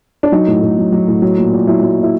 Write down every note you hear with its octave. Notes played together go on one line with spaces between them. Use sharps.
D4
F#3 D#4
A2
A2
F#3
F#3
A2
F#3
A#2
A#2
F#3 E4
F#3
A#2
E4